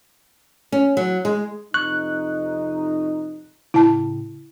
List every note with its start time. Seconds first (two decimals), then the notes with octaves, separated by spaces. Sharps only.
0.72 C#4
0.97 F#3
1.25 G#3
1.74 F2 C3 D#4 C#6 F#6
3.74 A2 C#3 E4 A5